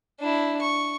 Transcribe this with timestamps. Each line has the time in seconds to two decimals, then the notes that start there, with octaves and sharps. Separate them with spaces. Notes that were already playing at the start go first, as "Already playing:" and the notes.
0.19 D4 E4
0.61 C#6